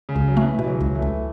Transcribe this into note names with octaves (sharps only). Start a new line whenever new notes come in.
C#3
C#2
F#3
E3 A3
B2 E3
C#3 F#3
C#2
E3 A3
C#2